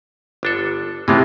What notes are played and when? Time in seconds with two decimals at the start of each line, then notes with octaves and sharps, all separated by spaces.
0.43 G1 D4 A4
1.08 A2 C3 E3 G#3 F4